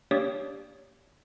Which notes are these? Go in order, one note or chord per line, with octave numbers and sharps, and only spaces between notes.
A#3 D4 G4 C#5 D5 D#6